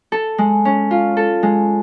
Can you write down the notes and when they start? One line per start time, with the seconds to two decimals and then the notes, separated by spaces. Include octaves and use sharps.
0.12 A4
0.38 G#3
0.65 C#4
0.91 F4
1.17 A4
1.43 G#3